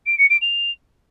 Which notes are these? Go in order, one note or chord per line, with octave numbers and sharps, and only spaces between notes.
D7
C#7
D7
F7